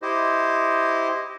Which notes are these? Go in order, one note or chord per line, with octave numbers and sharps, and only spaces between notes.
E4 G4 C5 D#5